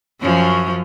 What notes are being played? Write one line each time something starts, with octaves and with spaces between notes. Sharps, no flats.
F#2 F3 C#4